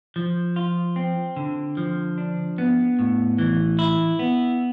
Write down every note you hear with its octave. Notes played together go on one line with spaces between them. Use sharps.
F3
F4
C4
D3
F3
D4
B3
A2
E3
E4
B3